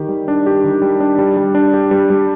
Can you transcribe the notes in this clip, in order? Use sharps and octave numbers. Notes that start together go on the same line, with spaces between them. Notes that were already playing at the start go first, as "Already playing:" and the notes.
Already playing: D#3 G4
G3
D4
G4
D#3
G3
D4
G3
G3
D4
G4
G3
G3